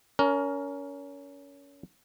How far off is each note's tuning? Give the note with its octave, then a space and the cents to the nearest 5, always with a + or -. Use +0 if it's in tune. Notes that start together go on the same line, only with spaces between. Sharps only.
C#4 +25 A#4 +0